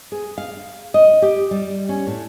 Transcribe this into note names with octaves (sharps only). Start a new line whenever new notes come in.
G#4
F5
D#5
G4
G3
C#4
A2